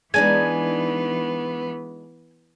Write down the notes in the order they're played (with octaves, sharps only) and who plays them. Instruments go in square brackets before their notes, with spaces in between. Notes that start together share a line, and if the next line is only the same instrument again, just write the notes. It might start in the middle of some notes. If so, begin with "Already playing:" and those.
[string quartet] E3 B3 [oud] G#3 D4 D#4 [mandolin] G#5